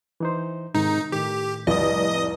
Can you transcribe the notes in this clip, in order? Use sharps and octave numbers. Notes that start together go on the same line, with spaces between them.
E3 D#4 C5
G#2 C3 D#3 D#4
A2 D#3 G4
F1 C2 D5 D#5 D#6